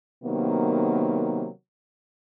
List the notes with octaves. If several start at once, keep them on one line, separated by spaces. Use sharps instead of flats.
C3 D#3 F#3 A#3 B3